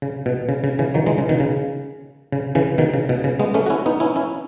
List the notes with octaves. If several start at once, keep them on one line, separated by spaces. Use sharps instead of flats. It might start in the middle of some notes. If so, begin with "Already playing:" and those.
C#3
B2
C#3
C#3
C#3 E3
D#3 F#3
E3 G#3
C#3
B2 D#3
C#3
C#3
C#3 E3
B2 D#3
C#3
B2
C#3
G#3 B3
A3 C#4
F#4
C#4 E4
B3 D#4
C#4 E4
C#4 E4